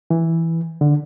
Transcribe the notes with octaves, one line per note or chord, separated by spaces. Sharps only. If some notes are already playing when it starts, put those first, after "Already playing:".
E3
D3